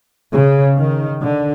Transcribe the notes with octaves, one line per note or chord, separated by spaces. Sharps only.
C#3
D#3
D3